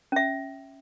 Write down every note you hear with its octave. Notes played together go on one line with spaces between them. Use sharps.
C#4 E5